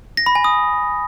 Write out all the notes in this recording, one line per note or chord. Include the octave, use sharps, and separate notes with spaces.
A#6
B5
G#5
D#6